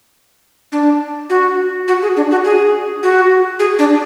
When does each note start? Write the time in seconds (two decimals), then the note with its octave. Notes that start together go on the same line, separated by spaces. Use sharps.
0.72 D4
1.30 F#4
1.88 F#4
2.02 G#4
2.17 D4
2.31 F#4
2.45 G#4
3.03 F#4
3.59 G#4
3.79 D4